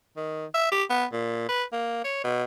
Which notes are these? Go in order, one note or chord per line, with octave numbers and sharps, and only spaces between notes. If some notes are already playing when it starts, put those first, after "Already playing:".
D#3
E5
G4
B3
A#2
B4
A#3
C#5
B2